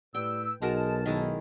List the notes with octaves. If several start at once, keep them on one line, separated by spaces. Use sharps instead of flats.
A2 G3 B4 G5 E6
B1 G#3 D#4 F#4 A#4 A5
D#3 G#3 D#4 E4